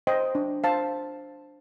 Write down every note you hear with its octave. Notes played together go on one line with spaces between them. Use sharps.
C5 D#5 G5
D4
C5 F5 A5